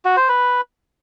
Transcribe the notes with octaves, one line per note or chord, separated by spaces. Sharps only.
F#4
C5
B4